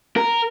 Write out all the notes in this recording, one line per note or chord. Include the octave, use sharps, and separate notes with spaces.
A#4